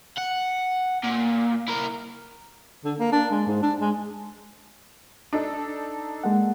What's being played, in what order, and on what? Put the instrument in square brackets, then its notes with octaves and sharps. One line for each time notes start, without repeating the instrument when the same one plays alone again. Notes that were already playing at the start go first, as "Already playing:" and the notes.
[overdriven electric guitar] F#5
A#2
E4 A#4
[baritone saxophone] D3
A#3
D4
G#3
G#2
D4
G#3
[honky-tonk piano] D4 D#4 A4
[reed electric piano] G#3 A#3 F#5